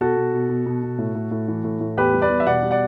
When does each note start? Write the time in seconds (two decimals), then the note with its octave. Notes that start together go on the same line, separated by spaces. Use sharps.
0.01 B2 F#4 A4
0.17 B2
0.34 B2
0.49 B2
0.66 B2
0.83 B2
0.98 A2
1.15 A2
1.31 A2
1.48 E3
1.64 A2
1.80 A2
1.97 E2 G4 B4
2.14 G3
2.22 B4 D5
2.29 E2
2.40 E5
2.46 B2 D5 F#5
2.62 G3
2.71 D5 F#5